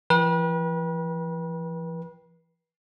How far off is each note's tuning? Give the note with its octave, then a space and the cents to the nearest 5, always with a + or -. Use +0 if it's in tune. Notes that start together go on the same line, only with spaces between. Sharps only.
E3 +45 B4 -35 G5 +10